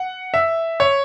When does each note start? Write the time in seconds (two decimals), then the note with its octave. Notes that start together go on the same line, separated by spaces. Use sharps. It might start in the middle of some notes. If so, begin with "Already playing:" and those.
Already playing: F#5
0.34 E5
0.80 C#5